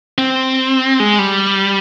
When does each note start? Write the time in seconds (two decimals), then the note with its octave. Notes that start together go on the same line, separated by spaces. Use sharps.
0.18 C4
1.00 G#3
1.19 G3